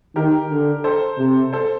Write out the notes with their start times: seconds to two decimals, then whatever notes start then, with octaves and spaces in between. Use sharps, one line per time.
0.16 D#3 G4 A#4
0.51 D3
0.84 A4 C5
1.19 C3
1.53 A4 C5